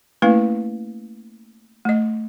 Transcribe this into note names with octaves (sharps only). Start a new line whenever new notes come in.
A3 A#3 C#4 E4 B4 F5
A3 D#5